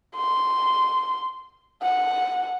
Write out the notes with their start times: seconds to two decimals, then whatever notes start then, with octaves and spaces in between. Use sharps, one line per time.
0.16 C6
1.82 F#5